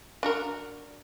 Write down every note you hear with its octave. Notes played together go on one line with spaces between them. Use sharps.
D4 F#4 A#4